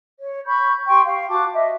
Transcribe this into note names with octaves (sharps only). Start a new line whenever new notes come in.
C#5
B5 C#6 G6
G4 G5 C6 C#6
F5
F#4 A5 D6
D#5 E5